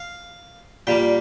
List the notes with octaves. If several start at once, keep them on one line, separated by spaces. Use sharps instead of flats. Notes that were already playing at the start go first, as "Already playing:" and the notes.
Already playing: F5
A#2 G3 A#3 G5